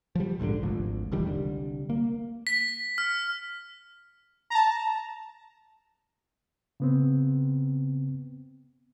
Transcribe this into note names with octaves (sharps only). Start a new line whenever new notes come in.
F3 G3
A#1 G#2 B2 D3
G#1 D2 F3
E1 E2 D#3 G3
C2 D3 G3
A#3
B6
F6
A5 A#5
C#3 B3 C4